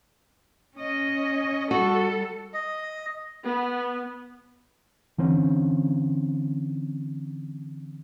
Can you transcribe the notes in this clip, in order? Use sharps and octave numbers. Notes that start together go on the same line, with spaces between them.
C#4 D#5
G3 F#4 A4
D#5
B3
D3 E3 C4 C#4